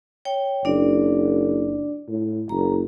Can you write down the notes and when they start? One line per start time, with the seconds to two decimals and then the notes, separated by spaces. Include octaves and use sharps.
0.25 C#5 G5
0.65 F#1 D4 D5
2.09 A2
2.49 F#1 A#5